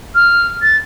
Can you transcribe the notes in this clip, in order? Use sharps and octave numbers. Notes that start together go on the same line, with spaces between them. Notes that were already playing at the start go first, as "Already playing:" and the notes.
F6
A6